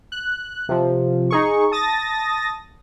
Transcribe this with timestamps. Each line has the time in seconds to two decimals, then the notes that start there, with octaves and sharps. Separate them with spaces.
0.12 F#6
0.69 C3 F3
1.31 D#4 G#4 C#6
1.72 A5 D#6 A6 A#6